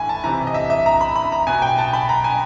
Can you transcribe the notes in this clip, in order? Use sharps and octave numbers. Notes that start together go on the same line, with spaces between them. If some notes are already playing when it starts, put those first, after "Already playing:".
Already playing: A2 E3 G#5 B5
A5
C3 E3 A#5
D#5
E5
E5
A#5
B5
B5
A#5
B2 G#5
G5
A5
B5
A#5
G#5